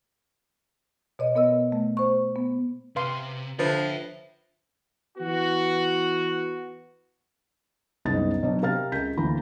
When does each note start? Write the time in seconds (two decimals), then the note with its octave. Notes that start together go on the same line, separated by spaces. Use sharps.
1.19 B2 C#5 D#5
1.35 B3 A#4 D#5 E6
1.72 A3
1.97 C5 C#6
2.36 B3
2.96 C3 B4 F5 C6
3.59 D3 F3 D4 A4 B4 C#5 E5
5.18 E3 B3 F#4
8.05 F#1 C2 B3 D#4 D#5 A6
8.43 B2 F#3 D4
8.62 C3 A#4 F5 A#5 F6 A6
8.92 C#2 G6 B6
9.17 D2 E3 A#3 A#5 B5